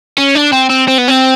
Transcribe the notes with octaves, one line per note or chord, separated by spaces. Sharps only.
C#4
D4
C4
C4
C4
B3
C4